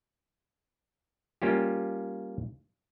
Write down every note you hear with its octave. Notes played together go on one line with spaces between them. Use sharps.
G3 A#3 C#4 F4 G4